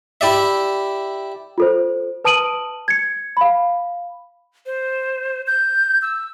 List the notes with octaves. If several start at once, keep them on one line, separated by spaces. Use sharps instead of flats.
E4 G4 D5 E5
F4 A4 C5
B4 A5 D#6 D7 D#7 F#7
G#6 C#7
F5 B5
C5
G6
E6